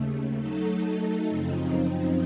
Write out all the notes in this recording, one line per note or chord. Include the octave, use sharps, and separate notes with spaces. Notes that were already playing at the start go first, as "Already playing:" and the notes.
Already playing: D#2 C#3 A3
F#3 A3 D#4 A4
F#2 C#3 F3 C4 D#4